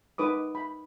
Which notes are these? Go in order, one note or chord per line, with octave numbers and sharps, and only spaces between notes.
D#4 B4 D6 D#6
B5